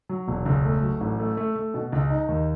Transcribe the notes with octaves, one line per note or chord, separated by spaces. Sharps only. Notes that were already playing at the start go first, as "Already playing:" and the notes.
F#3
E1
C#2
A3
F#3
A1
A3
A3
A3
B2
C#2
D#4
D#2